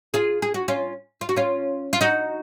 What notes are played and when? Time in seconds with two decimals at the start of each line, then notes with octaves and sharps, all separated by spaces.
0.14 F4 G#4
0.42 G#4
0.54 F#4
0.68 C#4 F4
1.21 F4
1.29 F#4
1.36 C#4 F4
1.93 F4
2.01 D#4 F#4